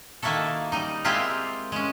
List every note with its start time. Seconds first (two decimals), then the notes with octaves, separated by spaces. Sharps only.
0.22 D#3 A#3 E4 F#4 A4
0.72 G3 D#4
1.05 G#3 A#3 C4 E4 F4 G4
1.72 G#3 C#4